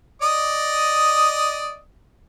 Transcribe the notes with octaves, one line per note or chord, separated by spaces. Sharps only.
D5 D#5 D#6